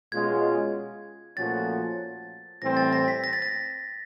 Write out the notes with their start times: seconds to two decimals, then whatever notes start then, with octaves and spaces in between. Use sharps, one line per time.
0.12 B2 G#3 C#4 F4 G#6
1.37 A#2 F3 A3 C#4 F#4 A6
2.61 A2 E3 G3 C4 A#6
2.77 A6
2.93 A#6
3.08 B6
3.24 A#6
3.33 A6
3.42 A#6